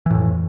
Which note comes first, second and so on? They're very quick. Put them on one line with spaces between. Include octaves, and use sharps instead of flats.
E3 A2 F2